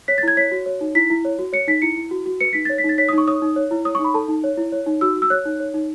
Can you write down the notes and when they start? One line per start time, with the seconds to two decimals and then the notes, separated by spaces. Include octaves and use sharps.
0.08 C#5 B6
0.18 A6
0.23 E4 G#6
0.37 C#5 B6
0.51 F#4
0.66 C#5
0.81 D#4
0.95 E4 B6
1.10 E4
1.25 C#5
1.39 F#4
1.53 C#5 C#7
1.68 D#4 B6
1.82 E4 C#7
1.97 E4
2.11 F#4
2.26 F#4
2.41 B4 C#7
2.53 D#4 B6
2.65 C#5 A6
2.78 B6
2.84 D#4
2.89 A6
2.98 C#5 B6
3.09 D#6
3.13 D#4 C#6
3.28 C#5 D#6
3.42 D#4
3.56 C#5
3.71 E4
3.85 C#5 D#6
3.95 C#6
3.99 D#4
4.04 B5
4.14 A4 A5
4.28 D#4
4.44 C#5
4.58 E4
4.72 C#5
4.86 D#4
5.01 F#4 E6
5.16 F#4
5.22 E6
5.30 C#5 F#6
5.45 D#4
5.60 C#5
5.74 D#4